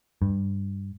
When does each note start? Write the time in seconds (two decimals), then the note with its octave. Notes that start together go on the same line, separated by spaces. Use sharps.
0.22 G2